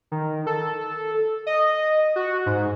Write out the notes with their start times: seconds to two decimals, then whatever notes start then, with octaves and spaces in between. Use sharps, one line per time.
0.12 D#3
0.47 A4
1.46 D#5
2.16 F#4
2.46 G#2